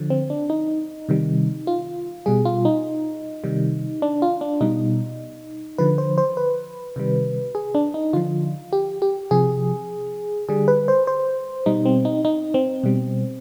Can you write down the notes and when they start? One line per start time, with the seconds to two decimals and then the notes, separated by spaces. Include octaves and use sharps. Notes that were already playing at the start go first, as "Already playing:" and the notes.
Already playing: D3 F3
0.10 C4
0.30 D4
0.50 D#4
1.09 C3 D#3 G3
1.67 F4
2.26 B2 G3 G#4
2.45 F4
2.65 D#4
3.44 C3 D#3 G3
4.02 D4
4.22 F4
4.41 D4
4.61 B2 G3 D#4
5.78 D3 F3 B4
5.98 C5
6.18 C5
6.37 B4
6.96 C3 D#3 G3
7.55 G#4
7.75 D4
7.94 D#4
8.13 D3 F3 F4
8.73 G4
9.02 G4
9.31 C3 F3 G#4
10.49 D3 G3 G#4
10.68 B4
10.88 C5
11.07 C5
11.66 B2 G3 D#4
11.86 C4
12.05 D#4
12.25 D#4
12.54 C4
12.84 B2 G3